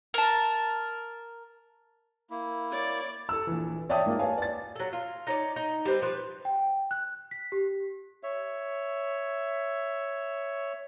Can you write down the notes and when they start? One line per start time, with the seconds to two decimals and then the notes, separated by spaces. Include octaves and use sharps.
0.14 A#4 A5
2.30 A#3 E4
2.71 C#5 D5
3.29 A4 E6
3.47 A#1 E3
3.89 C#5 D5 E5 G5 A5 D#6
4.06 G#2 A#3 F4
4.19 B4 C#5 F5 G#5 A5
4.38 D5 A6
4.75 F#3 A4
4.93 F4
5.27 D#4 C#5 D5
5.56 D#4
5.85 G3 C4 B4
6.02 F3 B4
6.45 G5
6.91 F#6
7.31 B6
7.52 G4
8.23 C#5 E5